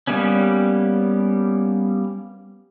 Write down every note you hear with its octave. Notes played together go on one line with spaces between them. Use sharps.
G3 A#3 B3 C#4